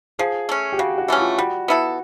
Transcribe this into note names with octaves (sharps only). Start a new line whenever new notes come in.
F3 G#4
A3 C#4
G4
C#3 F#4
F#4
E3 A3 C#4
F4
G3 F#4
B3 E4 A4